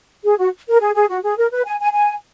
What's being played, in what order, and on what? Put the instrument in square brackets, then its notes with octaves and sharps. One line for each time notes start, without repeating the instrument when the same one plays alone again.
[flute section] G#4
F#4
A#4
G#4
G#4
F#4
G#4
A#4
B4
G#5
G#5
G#5